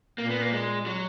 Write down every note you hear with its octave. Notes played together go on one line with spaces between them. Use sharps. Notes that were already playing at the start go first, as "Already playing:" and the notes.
A#2 A#3
B3
A#3
G#3
F#3